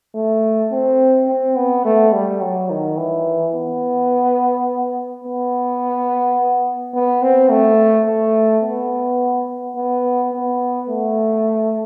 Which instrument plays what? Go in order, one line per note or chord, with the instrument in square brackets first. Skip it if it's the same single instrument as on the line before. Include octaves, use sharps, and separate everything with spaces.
[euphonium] A3
C4
C4
B3
A3
G3
F#3
D#3
E3
B3
B3
B3
C4
A3
A3
B3
B3
B3
A3